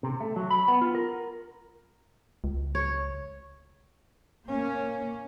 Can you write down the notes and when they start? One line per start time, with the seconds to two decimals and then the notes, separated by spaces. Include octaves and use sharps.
0.03 C3
0.20 A3
0.36 F#3
0.50 B5
0.68 B3
0.81 F4
0.95 A#4
2.44 C#2
2.75 C#5
4.46 A#3 C#4